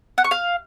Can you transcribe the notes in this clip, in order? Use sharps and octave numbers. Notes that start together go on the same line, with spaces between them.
F#5
C#6
F5